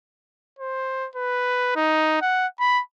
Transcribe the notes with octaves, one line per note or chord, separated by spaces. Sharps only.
C5
B4
D#4
F#5
B5